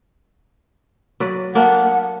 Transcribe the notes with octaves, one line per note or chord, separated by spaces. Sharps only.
F#3 B4 D5
A#3 D4 F#5